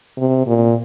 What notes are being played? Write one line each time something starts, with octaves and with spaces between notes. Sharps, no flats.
C3
A#2